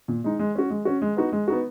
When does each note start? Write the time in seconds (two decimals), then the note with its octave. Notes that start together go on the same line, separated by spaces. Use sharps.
0.08 A#2
0.24 G#3 D#4
0.39 G#3
0.56 C#4 F#4
0.70 G#3
0.85 C#4 F#4
1.02 G#3
1.17 B3 D#4 F#4
1.32 G#3
1.48 B3 D#4 F#4